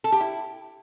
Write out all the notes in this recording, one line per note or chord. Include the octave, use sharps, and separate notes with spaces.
A4
G4
E4